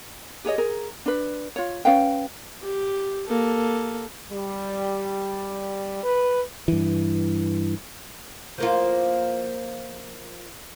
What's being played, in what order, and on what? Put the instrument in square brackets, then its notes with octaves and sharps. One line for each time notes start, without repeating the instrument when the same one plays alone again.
[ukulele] G4 G#4 C#5 D#5
G#4 A#4
D4 B4
F4 C#5
C#4 B4 F5 G5
[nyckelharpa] G4
A#3 A4
[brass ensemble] G3
B4
[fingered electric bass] G2 E3
[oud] F3 A#3 F4